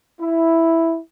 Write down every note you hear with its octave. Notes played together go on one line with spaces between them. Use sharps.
E4